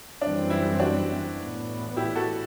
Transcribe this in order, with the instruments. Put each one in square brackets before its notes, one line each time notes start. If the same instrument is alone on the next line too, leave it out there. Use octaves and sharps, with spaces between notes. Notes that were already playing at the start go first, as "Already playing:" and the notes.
[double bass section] F#2 E3 G3 C4 [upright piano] D4
[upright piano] E4
D4 F#4
[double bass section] A2 E3 B3
[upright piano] E4 G4
F#4 A4